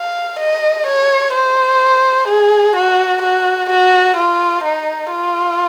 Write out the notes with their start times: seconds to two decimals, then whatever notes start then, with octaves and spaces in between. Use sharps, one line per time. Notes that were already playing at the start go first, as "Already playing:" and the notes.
Already playing: F5
0.39 D#5
0.87 C#5
1.34 C5
2.28 G#4
2.76 F#4
3.22 F#4
3.70 F#4
4.17 F4
4.64 D#4
5.11 F4